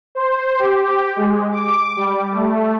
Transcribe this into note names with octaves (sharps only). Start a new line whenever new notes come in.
C5
G4
G#3
D6
G3
A3